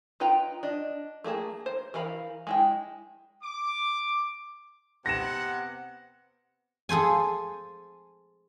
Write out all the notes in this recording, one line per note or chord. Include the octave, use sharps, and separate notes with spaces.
D#4 F4 B4 G5 A#5
D4 D#5
A3 A#3 G#4 A5
C5
E3 A#4 F5 B5
G#3 E4 G5
D6
C3 B3 F#5 A#6 E7
G#4 A4 C5 G#5